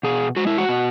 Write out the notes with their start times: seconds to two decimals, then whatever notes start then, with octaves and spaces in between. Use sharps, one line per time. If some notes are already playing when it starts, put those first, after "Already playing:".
0.03 B2 G#4
0.36 G#3 F#4
0.47 E4
0.58 F#4
0.69 B2